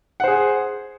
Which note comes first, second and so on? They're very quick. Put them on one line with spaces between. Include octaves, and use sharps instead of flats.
F#5 C5 G#4